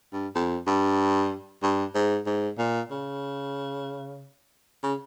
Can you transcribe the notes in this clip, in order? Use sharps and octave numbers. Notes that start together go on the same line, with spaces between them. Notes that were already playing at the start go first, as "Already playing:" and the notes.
G2
F2
G2
G2
G#2
G#2
A#2
C#3
C#3